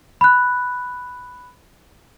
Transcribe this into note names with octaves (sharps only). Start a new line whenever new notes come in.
B5 F#6